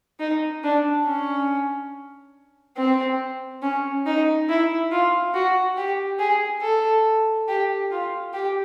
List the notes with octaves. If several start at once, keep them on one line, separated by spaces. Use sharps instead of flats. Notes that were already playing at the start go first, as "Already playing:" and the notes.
D#4
D4
C#4
C4
C#4
D#4
E4
F4
F#4
G4
G#4
A4
G4
F4
G4